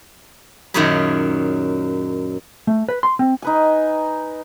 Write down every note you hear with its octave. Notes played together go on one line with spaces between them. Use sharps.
F#2 A#2 D#3 C#4 G#4 B5
A3
B4
C6
C4
D#4 B4 G#5